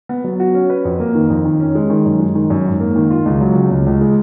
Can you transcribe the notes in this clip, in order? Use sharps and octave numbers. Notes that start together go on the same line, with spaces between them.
B3
F#3
F#4
C#4
B4
F2
A#3
D#3
F2
D#3
C#4
G#3
D#3
F#2
G#3
D#3
F#2
G#2
A#3
D#3
F4
C#2
F#3
C#3
C#2
C#2
G#3